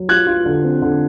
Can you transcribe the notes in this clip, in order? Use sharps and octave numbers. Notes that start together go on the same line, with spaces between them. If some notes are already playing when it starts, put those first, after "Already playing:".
Already playing: F#3
F4 F#6 G#6
F4
D3
C4
D3